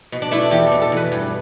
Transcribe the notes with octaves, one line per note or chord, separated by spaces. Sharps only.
B2
D4
A3 E4
D4
E2 G4
B2 A4
A4
E2 B4
G2